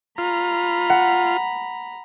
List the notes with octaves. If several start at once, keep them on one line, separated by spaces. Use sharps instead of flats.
F4 A#5 B5
F#5